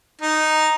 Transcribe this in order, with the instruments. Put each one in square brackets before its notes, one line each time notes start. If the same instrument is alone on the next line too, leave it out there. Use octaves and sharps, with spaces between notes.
[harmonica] D#4